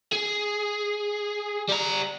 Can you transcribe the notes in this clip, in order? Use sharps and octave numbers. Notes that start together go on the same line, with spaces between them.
G#4
G3 A#5